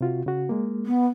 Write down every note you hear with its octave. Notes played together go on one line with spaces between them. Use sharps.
C3 F4 F#4
C#3 F#4
G#3 A#3
B3